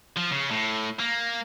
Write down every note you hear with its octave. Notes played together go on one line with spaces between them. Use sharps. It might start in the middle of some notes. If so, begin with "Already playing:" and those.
F3
C#3
A2
A#3